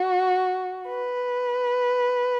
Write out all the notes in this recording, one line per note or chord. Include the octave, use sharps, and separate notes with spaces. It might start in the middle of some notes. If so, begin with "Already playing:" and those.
Already playing: F#4
B4